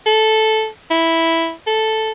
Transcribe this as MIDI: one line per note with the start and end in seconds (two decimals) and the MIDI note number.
0.06 0.68 69
0.90 1.52 64
1.67 2.12 69